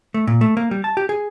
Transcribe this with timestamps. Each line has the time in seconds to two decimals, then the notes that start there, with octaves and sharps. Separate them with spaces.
0.14 A3
0.27 A#2
0.41 A3
0.57 A#3
0.71 G3
0.84 A5
0.97 G4
1.09 G#4